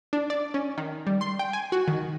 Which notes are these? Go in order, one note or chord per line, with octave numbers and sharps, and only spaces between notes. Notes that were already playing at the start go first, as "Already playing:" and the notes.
D4
D5
C#4
D#3
G3
C6
G5
G#5
F#4
D#3